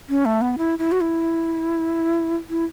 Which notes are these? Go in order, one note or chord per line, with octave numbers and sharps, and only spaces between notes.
C#4
A3
B3
E4
E4
F#4
E4
E4